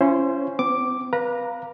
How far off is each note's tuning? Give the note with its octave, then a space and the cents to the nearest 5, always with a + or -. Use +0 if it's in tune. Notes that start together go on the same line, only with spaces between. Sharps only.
C#4 +0 E4 +40 C5 +0
C4 -45 D6 +0
B4 -25 F5 +0 A#5 +0